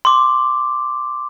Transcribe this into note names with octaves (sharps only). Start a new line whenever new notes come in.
C6 D6